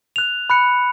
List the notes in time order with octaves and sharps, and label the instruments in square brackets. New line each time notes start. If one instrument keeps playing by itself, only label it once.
[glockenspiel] F#6 F7
B5 F#6 C#7